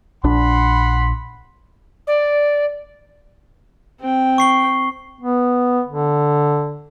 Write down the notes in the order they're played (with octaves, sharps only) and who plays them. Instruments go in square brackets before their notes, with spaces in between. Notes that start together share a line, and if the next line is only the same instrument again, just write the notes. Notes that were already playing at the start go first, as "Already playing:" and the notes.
[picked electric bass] A#1 D4 [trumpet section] F#5 B5 C6
[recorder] D5
[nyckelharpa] C4 G5
[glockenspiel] C#6 C7 G7
[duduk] B3
D3